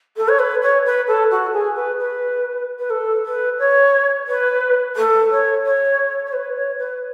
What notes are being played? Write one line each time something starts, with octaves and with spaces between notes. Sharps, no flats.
A4
C#5
B4
C#5
B4
A4
F#4
G#4
B4
B4
B4
A4
B4
C#5
B4
A4
C#5
C#5
C#5
B4
C#5
B4